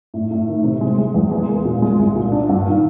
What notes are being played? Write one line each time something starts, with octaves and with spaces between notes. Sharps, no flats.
A2
A2
D#3
C3
G#3
G#3
E2
G#3
A#3
A#2
G#3
C2
A#2
D4
G2
D#3